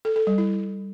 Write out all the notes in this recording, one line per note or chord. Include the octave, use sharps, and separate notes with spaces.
A4
A4
G3
E4